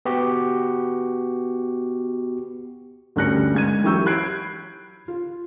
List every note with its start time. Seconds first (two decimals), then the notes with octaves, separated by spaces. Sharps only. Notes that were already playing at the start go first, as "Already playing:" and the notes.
0.05 B3 F#4 G4
3.16 D2 G2 C#4 F#6 A#6 C#7
3.55 G#3 G#6 D#7
3.84 E3 F#3 G4 C#6 E6 G6
4.06 B5 F#6 G#6 C7 D7
5.08 F4